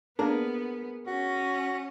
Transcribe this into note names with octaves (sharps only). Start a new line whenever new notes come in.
A#3 B3 D4 G#4 A#4
C#4 F#4